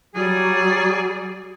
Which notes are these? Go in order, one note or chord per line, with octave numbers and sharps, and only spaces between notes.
F#3 G3 G#4 D5